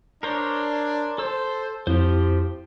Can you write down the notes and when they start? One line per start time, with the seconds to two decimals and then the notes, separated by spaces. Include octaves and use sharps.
0.23 D4 A#4 C5 C#5
1.18 A4 C5 E6
1.87 F2 F3 E4 G4 C5